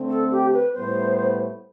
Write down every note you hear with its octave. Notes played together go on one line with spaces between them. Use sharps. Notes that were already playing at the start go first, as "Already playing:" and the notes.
Already playing: D3 A3 C4
A4
G4
B4
A2 G3 B3 C5